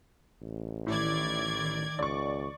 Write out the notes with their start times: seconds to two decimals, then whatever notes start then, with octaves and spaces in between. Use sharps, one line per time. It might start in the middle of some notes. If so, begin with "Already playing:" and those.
0.42 A1
0.87 A2 D#3 D5 G#6
1.99 C#2 D5 C#6